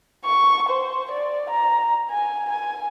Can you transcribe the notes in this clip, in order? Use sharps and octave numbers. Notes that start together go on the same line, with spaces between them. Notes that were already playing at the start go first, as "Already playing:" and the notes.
C#6
C5
D5
A#5
G#5
G#5